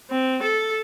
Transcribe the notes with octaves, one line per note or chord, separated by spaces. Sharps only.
C4
A4